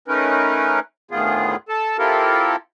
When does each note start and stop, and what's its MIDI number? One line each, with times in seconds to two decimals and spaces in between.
0.08 0.80 57
0.08 0.80 61
0.08 0.80 63
0.08 0.80 70
0.08 0.80 71
1.11 1.56 38
1.11 1.56 45
1.11 1.56 51
1.11 1.56 59
1.11 1.56 65
1.11 1.56 68
1.69 1.97 69
1.69 1.97 81
1.98 2.56 60
1.98 2.56 64
1.98 2.56 65
1.98 2.56 67
1.98 2.56 69
1.98 2.56 70